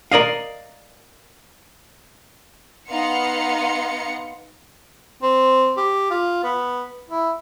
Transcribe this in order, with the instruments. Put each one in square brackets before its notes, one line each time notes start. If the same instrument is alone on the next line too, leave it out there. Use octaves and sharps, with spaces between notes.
[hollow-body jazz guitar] A#4 D5 D#5 F5
[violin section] B3 D#4 F5 F#5 C6 C#7
[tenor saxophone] C4
G4
F4
B3
E4